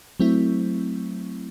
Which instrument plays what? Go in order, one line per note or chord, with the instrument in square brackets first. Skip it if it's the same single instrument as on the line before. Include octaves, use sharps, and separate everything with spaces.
[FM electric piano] F#3 A3 C4 E4